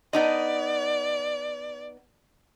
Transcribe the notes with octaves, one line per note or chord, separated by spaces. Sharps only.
B3 D#4 D5 D#5